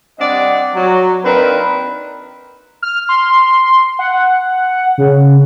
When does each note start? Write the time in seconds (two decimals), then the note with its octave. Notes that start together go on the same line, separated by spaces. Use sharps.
0.19 G3 C4 D4 D5 D#5 F#5
0.75 F#3
1.24 A#3 C4 D4 D#4 A#4 B4
2.83 F6
3.09 C6
3.99 F#5
4.98 C#3